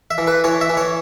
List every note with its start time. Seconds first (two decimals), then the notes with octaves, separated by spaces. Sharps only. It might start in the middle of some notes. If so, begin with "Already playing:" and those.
0.11 E5
0.18 E3
0.27 B4
0.44 E3 C#5
0.61 E5
0.70 E3
0.77 C#5